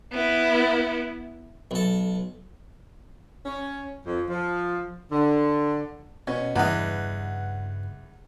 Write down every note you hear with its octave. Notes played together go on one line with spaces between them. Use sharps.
B3 E4
B1 A4
C#4
F2
F3
D3
B2 C#4
E2 G2 C#3 G3 B4 D#5 F#5